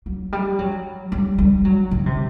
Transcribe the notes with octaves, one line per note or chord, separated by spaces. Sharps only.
F#3
G3
F#3
G3
G3
F#3
D#3
C3